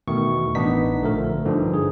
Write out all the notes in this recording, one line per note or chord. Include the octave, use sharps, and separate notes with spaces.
E2 B2 D#3 A3 C#6
A1 B3 D4 D#4 B6
A#1 D3 F3 A3 A#4
G2 D3 F3 D#4
G#4